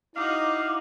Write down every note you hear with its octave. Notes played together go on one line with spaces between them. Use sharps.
D#4 E4 F#4 D#5 F5 D6